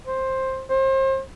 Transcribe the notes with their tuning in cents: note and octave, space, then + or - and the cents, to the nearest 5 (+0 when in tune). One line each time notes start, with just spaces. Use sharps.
C5 +10
C5 +35